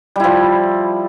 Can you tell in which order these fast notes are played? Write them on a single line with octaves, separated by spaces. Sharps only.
G3 E4 F3